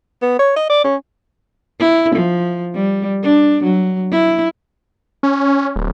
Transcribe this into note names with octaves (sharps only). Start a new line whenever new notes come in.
B3
C#5
D#5
D5
C#4
E4
F3
G3
D4
F#3
E4
C#4
D1